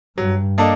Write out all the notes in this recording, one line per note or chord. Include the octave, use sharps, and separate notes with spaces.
G2 F#3
A#3 D4 A4 D#5